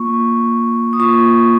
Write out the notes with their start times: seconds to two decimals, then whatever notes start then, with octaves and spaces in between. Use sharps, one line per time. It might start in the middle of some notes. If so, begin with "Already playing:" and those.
Already playing: A#3 F4 C#6
0.93 D#6
1.00 A#3 F4 C#6